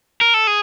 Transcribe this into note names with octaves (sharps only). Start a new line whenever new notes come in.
A#4
A4
G#4